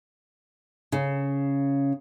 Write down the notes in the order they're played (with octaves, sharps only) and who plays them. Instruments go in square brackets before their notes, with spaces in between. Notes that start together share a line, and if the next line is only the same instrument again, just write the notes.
[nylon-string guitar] C#3